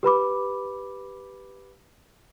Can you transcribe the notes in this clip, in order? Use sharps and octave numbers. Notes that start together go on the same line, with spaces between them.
G4 B4 B5 D6